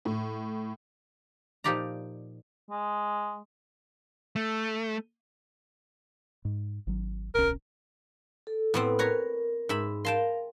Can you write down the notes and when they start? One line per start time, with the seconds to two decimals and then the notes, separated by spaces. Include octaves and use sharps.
0.05 A2
1.64 A#2 F3 D#4 G4 D5 A#5
2.71 G#3
4.36 A3
6.45 G#2
6.87 G#1 F#3
7.35 D1 B1 C#4 A#4
8.47 A4
8.74 A2 B3 C4
8.99 A#4 B4 C#5 A#5
9.69 G#2 E5 B5
10.05 A#4 F5 G5 A5 C6